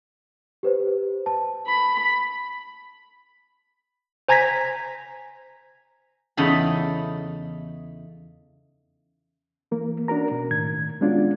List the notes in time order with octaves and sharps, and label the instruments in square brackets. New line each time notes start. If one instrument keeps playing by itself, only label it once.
[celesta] G4 B4 C5
A5
[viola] B5
[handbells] C5 G#5 A#5 G#6 A#6 B6
[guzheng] E2 C#3 D#4 A4 B5
[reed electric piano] E3 A#3 A#4
C#4 D4 F#4 A#4 A#5
B2
A2 D#3 G#6
G#3 B3 C#4 D4 F4 F#4